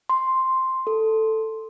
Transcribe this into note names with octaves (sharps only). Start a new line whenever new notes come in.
C6
A4